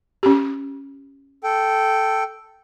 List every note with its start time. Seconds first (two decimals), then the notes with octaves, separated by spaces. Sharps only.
0.23 C#4 G4
1.44 A4 G5